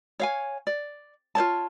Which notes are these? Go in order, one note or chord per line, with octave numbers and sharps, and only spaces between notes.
C#5 F5 G#5
D5
F4 C5 C#5 A5